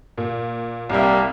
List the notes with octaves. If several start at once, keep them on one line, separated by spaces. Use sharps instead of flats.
A#2
C2 G3 A#3 E5